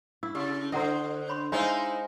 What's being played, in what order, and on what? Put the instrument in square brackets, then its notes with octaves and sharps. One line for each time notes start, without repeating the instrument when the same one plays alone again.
[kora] E4 [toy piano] E6
[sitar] C#3 [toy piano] G4
[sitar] D3 [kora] C5 D#5 [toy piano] E5 F#5 A#5
[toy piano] C#5 B5 C6
[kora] G#3 C5 F5 [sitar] D#4 E4 [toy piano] C#5 D#5